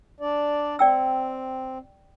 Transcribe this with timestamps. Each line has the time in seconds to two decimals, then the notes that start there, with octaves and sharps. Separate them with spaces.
0.20 D4 D5
0.79 C4 D5 G5 E6